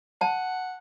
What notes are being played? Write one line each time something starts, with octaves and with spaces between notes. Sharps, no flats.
F#5 A5